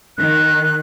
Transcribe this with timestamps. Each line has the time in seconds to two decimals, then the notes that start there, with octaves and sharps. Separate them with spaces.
0.17 D#3 F#6